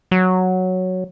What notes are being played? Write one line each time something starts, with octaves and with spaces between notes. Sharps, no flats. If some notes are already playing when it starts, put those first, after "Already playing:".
F#3